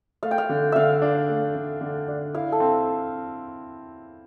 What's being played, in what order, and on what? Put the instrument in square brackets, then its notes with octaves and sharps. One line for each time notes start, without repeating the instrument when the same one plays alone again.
[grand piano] A3 [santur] F5
[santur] G5
F5
[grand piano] D3
[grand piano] D3 [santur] E5 F5
[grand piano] D4
A3
D3
D3
D4
[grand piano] E4 [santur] F5
[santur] A4
[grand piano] C4